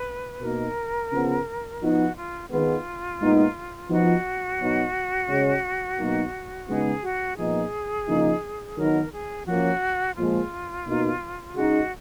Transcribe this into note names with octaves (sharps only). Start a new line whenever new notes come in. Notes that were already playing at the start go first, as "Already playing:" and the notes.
Already playing: B4
B2 A#3 D#4 A#4
C#3 F3 B3
F3 B3 D#4 F#4
F4
D#3 G#3 B3 F4
A#2 G#3 B3 D#4
F3 B3 D#4 F#4
B2 F#3 B3 D#4
C#3 G#3 C#4
B2 F#3 A#3 D#4
C#3 G#3 B3 D#4 G#4
F#4
A#2 F3 B3 D#4 G#4
C#3 F3 A#3 D#4
D#3 F#3 B3 D#4 A#4
G#4
F3 A#3 C#4 F#4
A#2 F3 G#3 F4
B2 A#3 D#4
C#3 G#3 D#4 F#4